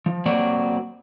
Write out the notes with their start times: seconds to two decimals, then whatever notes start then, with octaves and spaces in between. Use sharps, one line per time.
0.06 F3
0.26 F#3 A#3 C4 F#4 D5